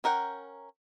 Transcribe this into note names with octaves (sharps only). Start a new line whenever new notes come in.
C#4 A#4 F#5 G5